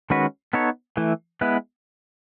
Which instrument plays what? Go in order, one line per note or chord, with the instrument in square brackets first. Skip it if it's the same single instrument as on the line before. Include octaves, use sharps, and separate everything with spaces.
[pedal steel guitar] D#3 G#3 C#4 F#4 B4
B3 D#4 A4 C#5
E3 A3 E4
G#3 B3 E4 B4